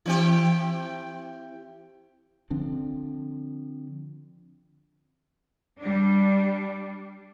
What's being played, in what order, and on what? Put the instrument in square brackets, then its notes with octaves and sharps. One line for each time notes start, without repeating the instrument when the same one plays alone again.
[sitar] E3 C4 G4
[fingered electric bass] D3 F3 C4 D4
[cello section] G3 D4